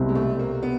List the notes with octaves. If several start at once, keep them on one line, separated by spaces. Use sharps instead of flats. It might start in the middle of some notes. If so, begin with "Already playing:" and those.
Already playing: C2 B2 G3 C4
G#3
A3
A#3
B3